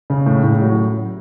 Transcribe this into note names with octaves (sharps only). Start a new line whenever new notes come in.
C#3
A2
A2
F#3